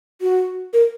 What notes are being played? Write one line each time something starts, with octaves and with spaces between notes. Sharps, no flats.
F#4
A#4